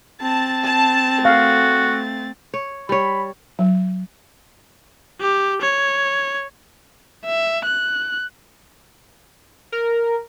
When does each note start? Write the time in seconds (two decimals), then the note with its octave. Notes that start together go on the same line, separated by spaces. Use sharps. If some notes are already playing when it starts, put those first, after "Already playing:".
0.21 C4 A5 A6
0.65 A5
1.25 A3 F#4 F5
2.54 C#5
2.89 G3 C#5 B5
3.59 F#3
5.20 G4
5.61 C#5
7.26 E5
7.65 F#6
9.72 A#4